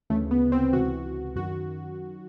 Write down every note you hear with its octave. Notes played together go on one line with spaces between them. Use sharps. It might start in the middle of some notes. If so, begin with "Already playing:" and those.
D2 C#3 E3 A3
B3
C4
C#2 C3 E3 F#4
F#2 D#3 F#4